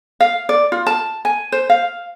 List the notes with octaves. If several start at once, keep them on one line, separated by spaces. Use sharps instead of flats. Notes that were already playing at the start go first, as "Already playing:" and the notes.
F5
D5
F4
A5
G#5
C5
F5